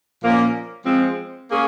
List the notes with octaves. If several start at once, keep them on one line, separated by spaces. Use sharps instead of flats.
A#2 F3 A#3 C#4
F3 G#3 C4
A#3 C#4 G#4